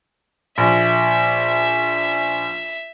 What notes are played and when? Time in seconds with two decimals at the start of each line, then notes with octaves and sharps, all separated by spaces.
0.58 A#1 E5